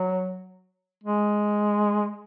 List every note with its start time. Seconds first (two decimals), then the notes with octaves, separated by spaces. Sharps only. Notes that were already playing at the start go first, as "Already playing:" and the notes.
Already playing: F#3
1.04 G#3